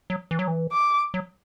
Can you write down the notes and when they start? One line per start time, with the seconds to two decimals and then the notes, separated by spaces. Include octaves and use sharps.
0.10 F#3
0.31 E3
0.39 F#3
0.48 E3
0.72 D6
1.14 F#3